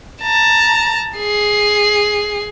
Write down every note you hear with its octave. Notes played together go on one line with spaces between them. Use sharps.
A5 A#5
G#4 C7